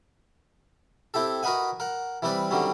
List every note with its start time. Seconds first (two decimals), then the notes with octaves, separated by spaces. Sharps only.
1.14 C4 E4 G4 A4
1.43 F#4 A#4 B4 D#5 F#5 G#5
1.80 A#4 F#5
2.22 E3 G3 C4 B4 D5
2.51 D3 D#3 F#3 G3 C4 C#4